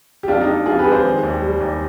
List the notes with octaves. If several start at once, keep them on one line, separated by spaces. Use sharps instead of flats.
G4
F2 D4 F4
D#4 G4
F2
F2 F4 G#4
G4 B4
G#3
G#4 C5
D#3
D#2
G3
D#2